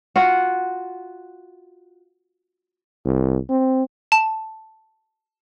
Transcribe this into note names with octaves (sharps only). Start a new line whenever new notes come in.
F4 F#4
C2
C4
A5